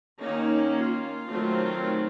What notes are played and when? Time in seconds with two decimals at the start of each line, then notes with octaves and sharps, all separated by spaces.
0.21 D#3 A#3 C#4 D#4
0.75 F4
1.29 D#3 F#3 A3 C4